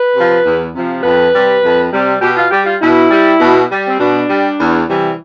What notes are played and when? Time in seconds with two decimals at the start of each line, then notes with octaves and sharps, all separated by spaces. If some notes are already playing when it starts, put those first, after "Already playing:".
Already playing: B4
0.15 C3 F3
0.44 E2
0.73 C3 F3
1.03 F2 B4
1.32 C3 G3
1.62 F2
1.91 C3 G3
2.21 B2 G4
2.36 F4
2.50 G3 G4
2.65 F4
2.80 B2 E4
3.10 G3
3.39 B2
3.69 G3
3.87 C4
3.98 B2 D4
4.28 G3
4.58 E2
4.87 C3 E3 G3